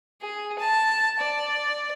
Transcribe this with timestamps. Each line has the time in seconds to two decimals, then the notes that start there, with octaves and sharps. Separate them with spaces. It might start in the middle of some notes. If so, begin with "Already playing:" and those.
0.22 G#4
0.59 A5
1.20 D5